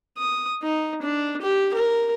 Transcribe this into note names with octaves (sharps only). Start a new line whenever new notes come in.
D#6
D#4
D4
G4
A#4